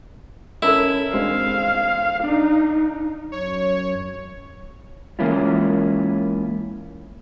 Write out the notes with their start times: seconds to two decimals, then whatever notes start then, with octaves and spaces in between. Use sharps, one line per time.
0.62 C#4 E4 A4 A#4
1.13 G2 G#3 C4 F5
2.24 D4 D#4
3.32 F#2 C#5
5.19 E3 G#3 A#3 C#4 E4 F4